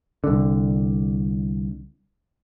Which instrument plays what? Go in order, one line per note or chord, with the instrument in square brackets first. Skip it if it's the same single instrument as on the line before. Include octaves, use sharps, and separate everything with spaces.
[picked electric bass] C2 D3